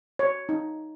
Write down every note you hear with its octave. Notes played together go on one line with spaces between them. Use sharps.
C#5
D#4